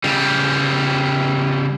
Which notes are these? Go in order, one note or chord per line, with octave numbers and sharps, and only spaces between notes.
C#3 G3